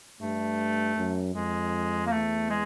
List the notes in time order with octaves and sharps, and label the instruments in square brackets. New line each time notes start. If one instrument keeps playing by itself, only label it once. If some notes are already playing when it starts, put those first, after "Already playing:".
[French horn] G2 [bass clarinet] A3
[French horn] F#2
[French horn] F2 [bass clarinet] G#3
[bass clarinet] A#3
[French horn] E2 [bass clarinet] A3
[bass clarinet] G#3